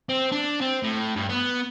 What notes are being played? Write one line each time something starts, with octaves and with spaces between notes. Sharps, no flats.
C4
D4
C4
A2
G2
B3